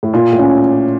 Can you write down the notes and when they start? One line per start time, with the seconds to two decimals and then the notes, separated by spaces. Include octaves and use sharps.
0.03 A2
0.13 A#2 F4
0.32 A2
0.39 C#4